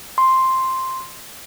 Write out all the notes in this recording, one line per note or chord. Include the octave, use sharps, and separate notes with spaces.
C6